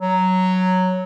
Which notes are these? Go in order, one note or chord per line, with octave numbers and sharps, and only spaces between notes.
F#3